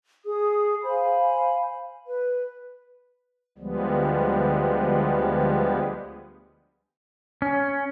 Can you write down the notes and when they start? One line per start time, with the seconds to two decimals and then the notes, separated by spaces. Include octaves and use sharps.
0.25 G#4 D#6
0.83 C5 F5 G#5 B5
2.06 B4
3.58 D2 F3 G3 G#3 B3
7.42 C#4